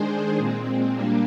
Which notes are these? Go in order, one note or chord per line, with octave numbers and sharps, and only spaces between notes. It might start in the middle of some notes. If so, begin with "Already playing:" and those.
Already playing: D#3 G#3 D4 G#4 C5
A#2 G#3 C4
A#2 G3 A#3 D4